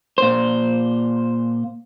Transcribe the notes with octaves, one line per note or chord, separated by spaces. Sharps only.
A#2 C5